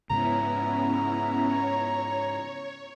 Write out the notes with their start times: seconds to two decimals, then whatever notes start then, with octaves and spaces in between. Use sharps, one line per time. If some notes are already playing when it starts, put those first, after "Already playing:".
0.10 G#2 C#3 B3 C#4 E4 A#5
1.46 C#5